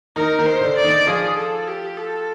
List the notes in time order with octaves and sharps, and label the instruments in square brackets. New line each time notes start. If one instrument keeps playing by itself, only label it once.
[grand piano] D#3 D#4 [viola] A#4
[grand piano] D#3 D#4
[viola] C5
[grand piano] D3 D4
[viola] D5
[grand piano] D#3 D#4
[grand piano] F3 F4 [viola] G#4
[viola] A4
G4
A4